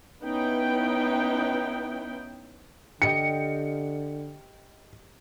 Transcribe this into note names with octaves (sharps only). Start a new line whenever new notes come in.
B3 C#4 D#4 E4 B4 G5
D3 G4 D#5 G5 C#7